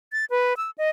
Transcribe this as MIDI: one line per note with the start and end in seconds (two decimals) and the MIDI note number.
0.12 0.25 93
0.30 0.57 71
0.57 0.71 88
0.78 0.90 75